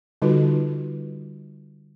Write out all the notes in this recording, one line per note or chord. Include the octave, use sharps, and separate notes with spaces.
D3 G3 D#4 F4 F#4 B4